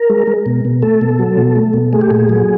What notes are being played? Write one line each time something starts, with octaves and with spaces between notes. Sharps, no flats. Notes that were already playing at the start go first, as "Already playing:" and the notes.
Already playing: A#4
G#3
G#3
B2
B2
A3 A4
B2
F#3
B2
A3
B2
A3 G#4
G4
A#2 G#4
F#3